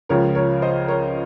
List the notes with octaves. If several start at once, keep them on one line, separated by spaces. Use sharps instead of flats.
C#2 C#3 F3 A#4 C#5
A#4 C#5
C5 D#5
A#4 C#5